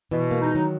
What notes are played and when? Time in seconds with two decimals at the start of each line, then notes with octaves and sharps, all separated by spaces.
0.11 B2 E3
0.31 A#3
0.41 G#3 D#4
0.55 D#3 F#3